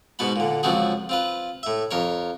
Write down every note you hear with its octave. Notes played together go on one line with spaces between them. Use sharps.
G#2 B2 B3 F#4 B5
A#2 D3
C#2 F#2 F3 C4 F#4 G#4
C4 F4 B4
A2 E5
F2 A#4 C#5